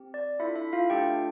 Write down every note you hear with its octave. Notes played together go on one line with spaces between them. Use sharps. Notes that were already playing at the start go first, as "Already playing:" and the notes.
Already playing: C4 G4
D5
D4 E4 F4 A4 E5
E4 E5
F4 F5
A3 D4 G4 A4 G5